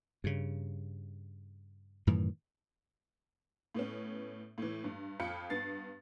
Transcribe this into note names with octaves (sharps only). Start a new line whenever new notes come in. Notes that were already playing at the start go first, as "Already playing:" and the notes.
G2 C#3
F#2 A2 D#3 E3
A2 B3 C#4
A2 E3
G2
F2 F4 B5 C#7
G2 B3 A6 C7